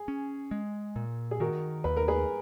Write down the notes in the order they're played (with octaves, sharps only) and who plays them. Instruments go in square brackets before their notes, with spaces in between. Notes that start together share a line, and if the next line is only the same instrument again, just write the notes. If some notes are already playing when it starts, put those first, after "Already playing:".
Already playing: [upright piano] G#4
[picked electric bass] C#4
G#3
A#2
[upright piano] G#4
[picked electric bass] D#3 [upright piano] F#4 A#4
[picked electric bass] D#2 [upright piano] B4
[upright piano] A#4
G#4 B4